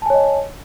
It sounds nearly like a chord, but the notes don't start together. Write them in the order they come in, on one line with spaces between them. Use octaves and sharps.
A5 G#5 C#5 D#5